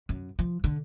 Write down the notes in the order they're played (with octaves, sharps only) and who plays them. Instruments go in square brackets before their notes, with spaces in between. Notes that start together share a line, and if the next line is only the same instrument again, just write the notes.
[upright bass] F#2
F3
D3